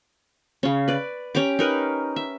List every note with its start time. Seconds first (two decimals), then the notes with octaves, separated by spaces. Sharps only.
0.63 C#3 C#4
0.88 B4 D5
1.35 C#4 G4 A#5 D6
1.59 D#4 A#4 B4
2.16 E5